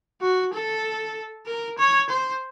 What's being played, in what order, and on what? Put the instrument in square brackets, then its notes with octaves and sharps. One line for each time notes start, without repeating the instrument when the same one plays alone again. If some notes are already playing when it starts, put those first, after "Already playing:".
[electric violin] F#4
A4
A#4
C#5
C5